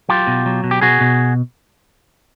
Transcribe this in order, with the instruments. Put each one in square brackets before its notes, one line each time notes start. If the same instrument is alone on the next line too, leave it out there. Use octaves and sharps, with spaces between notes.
[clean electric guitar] F#3 F4 G4
B2
F#3
B2
G4
B2 F#4 G#4
B2